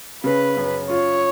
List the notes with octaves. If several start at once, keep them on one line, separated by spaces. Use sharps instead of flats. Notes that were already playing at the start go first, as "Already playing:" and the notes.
C#3 B4
F#2
F4 C#5